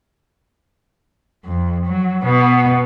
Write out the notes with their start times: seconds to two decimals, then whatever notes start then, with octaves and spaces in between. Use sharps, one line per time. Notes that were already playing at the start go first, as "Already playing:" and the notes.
1.45 F2
1.87 F#3
2.24 B2 B3